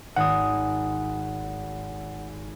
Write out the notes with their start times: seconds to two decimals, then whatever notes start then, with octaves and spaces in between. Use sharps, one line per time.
0.16 G#1 F#5 D#6